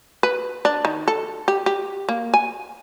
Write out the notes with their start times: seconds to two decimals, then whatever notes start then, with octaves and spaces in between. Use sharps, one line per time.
0.23 B4
0.65 D4
0.85 D#3
1.08 A4
1.48 G4
1.66 G4
2.09 A#3
2.34 G#5